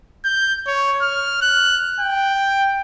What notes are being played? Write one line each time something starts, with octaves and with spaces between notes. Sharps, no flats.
G6
C#5
F6
F#6
G5